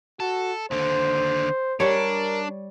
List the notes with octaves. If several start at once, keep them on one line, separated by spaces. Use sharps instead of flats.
F#4 A4
D#2 D3 C5
G3 D4 A#4 C#5